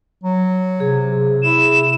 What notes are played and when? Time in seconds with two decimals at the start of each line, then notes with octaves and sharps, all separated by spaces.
0.23 F#3
0.80 C3 G#4
1.43 E4 E7